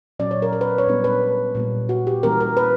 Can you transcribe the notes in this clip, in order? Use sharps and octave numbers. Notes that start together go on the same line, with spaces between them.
A#2 F#3 C#4 D5
C#5
A#4
A#4
B4
C#5
A#2 G3 B3 D4
B4
A#2 G3 A#3
F#4
G4
E3 G3 A#3 C#4 A#4
A#4
B4